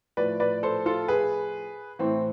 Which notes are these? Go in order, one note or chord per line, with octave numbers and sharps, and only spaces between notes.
A2 F3 B4 D5
B4 D5
A4 C5
F4 A4
G#4 B4
A2 E3 C4